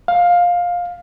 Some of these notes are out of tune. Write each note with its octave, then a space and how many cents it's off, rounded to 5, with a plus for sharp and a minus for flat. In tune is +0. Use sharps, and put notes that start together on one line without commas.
F5 +15